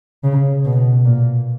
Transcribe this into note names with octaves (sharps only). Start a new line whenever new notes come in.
C#3
B2
A#2